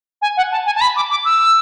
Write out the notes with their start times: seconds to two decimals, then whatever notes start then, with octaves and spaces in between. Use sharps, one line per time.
0.21 G#5
0.37 F#5
0.51 A5
0.65 G#5
0.75 A5
0.81 B5
0.96 D6
1.10 D6
1.25 E6